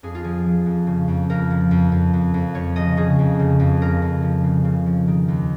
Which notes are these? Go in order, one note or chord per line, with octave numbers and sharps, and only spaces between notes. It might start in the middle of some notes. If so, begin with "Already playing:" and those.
F2 G#4
F4
F3 G#4
F3
F2
C#3
F2
F2 A#4
F3
F2
F2
F2
F2
F3 C#5
C#3 D#5
C#3 G#4
F2
C#3
F2
C#3 A#4
F2
F3
C#3
C#3
F3
D#3
D#2